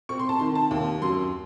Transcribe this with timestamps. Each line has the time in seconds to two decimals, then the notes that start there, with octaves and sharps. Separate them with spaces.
0.09 C4 C#6
0.19 C6
0.29 A5
0.40 D#3 C6
0.55 A5
0.71 D#2
1.01 F#2 C6